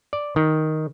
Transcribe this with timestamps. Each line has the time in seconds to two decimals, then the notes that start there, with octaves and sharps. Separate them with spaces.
0.13 D5
0.36 D#3